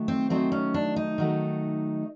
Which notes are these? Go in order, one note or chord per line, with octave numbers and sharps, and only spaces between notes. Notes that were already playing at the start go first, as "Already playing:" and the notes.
Already playing: D#3 F#3 A3
C4
D#3 F#3 A3 C4
C#4
D4
D#4
D#3 F#3 A3